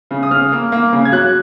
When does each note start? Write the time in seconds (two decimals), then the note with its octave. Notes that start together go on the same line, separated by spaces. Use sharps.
0.11 C#3
0.23 D#6
0.31 C#3 F6
0.52 A#3
0.72 A#3
0.93 C#3
1.05 G#6
1.12 F#3 F#6